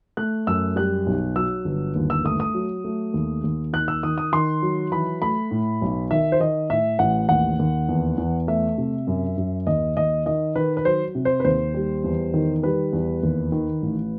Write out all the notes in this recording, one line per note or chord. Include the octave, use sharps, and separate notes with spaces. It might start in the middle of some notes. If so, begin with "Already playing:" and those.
A3 F#6
F#2 E6
G3 F#6
B1
F#3 E6
G1
D#2
E6
A3 D#6
D#6
F#3
A3
D#2
D#2
D#3 F#6
E6
D#3 D#6
D#6
D#3 C6
F#3
E3 B5
A3 B5
A2
B1
D#3 E5
C5
D#3 D#5
A2 E5
A1 F#5
D#2 F#5
D#2
E2
E2
A3 E5
C3
F#2
F#2
D#2 D#5
D#2 D#5
D#3 D#5
D#3 B4
B4
F#3 C5
C3
C5
B4
D#2 C5
G3
E2
D#3
G3 B4
E2
D#2
D#3
A1